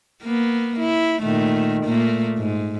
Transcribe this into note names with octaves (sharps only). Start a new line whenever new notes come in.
A#3 B3
E4
A#2 D#3 A3
A#2 A3 A#3
G#2